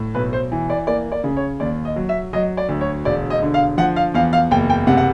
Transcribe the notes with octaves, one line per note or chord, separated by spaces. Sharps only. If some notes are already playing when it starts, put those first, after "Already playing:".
Already playing: A2
B1 B4
C5
E3
D5
A#3 D5
D5
C#3
C#5
D#2 D5
D#5
F#3
E5
F#3 D#5
D5
D2
C#5
E1 D5
D#5
D3
F5
F3 F#5
F5
E2 F5
F5
F#1 G5
G5
C3 F#5
F#5